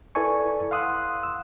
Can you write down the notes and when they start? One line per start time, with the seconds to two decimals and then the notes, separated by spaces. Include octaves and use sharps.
0.15 E4 A4 B4 D5 G#5 C#6
0.71 F5 F#5 C6 D#6 E6 F#6
1.23 E6